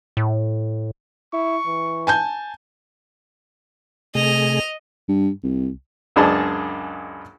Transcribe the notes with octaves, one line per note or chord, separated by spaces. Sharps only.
A2
E4 C#6
E3
G#5 A5 G6
C3 A3 G#4 D#5 F7
G2
C2
C#2 F#2 D4 G#4 D#5 A5